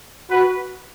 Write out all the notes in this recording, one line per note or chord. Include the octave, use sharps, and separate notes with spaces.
F#4 B4